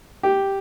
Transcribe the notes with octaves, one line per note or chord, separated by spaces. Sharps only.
G4